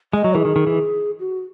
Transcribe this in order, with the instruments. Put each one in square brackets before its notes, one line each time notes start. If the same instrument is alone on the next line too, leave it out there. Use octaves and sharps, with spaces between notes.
[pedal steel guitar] G#3 [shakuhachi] D#5
[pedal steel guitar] F#3
[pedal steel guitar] E3 [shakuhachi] G#4
[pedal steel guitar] D#3
D#3
E3
[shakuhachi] F#4